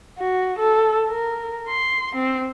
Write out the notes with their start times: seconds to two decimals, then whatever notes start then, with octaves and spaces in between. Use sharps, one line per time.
0.18 F#4
0.58 A4
1.08 A#4
1.68 C6
2.15 C4